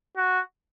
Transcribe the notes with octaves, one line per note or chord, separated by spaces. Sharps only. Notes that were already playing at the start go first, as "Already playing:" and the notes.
F#4